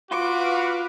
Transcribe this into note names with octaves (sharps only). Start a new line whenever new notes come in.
F4 F#4 B4 F5 D6